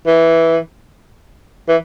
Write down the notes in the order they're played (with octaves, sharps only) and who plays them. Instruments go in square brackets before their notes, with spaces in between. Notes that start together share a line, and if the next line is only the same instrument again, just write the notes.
[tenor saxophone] E3
E3